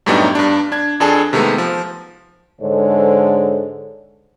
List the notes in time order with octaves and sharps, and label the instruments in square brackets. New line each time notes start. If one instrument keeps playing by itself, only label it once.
[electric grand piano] F#2 A2 G3 B3 D4 D#4
G2 D4
D4 G#6
F2 D4 G#4 A4
C3 D#3 G#3 A3 B3
F3
[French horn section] G#2 D3 G#3 A4 C5 C#5